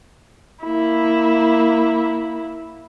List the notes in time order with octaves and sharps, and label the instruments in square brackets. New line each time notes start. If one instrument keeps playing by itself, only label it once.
[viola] A#3 E4